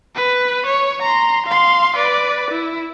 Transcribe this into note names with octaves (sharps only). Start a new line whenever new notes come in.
B4
C#5
A#5 C6
F5 C6
B4 D5
E4